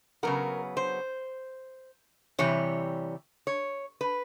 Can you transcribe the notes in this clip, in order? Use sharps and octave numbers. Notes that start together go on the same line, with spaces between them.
C#3 F#3 B3 A#4
C5
C3 E3 G3 C#5
C#5
B4